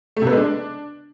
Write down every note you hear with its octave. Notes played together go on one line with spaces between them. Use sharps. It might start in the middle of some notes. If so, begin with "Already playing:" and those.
A3
C3
B3
G#3
D4